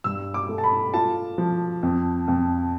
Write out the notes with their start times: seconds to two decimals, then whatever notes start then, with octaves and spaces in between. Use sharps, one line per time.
0.04 G2 E6
0.34 D6
0.49 A3
0.58 A5
0.64 B5
0.94 F4 A5
1.38 F3
1.83 F2
2.28 F2